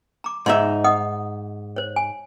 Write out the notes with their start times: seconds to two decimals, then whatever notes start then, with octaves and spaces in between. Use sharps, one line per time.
0.24 A#5 D6
0.46 G#2 D#4 E5 C6
0.84 D#5 F#5 D#6
1.76 C5 C#5
1.96 G#5